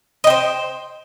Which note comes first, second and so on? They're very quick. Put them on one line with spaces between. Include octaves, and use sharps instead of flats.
D#5 G5 C5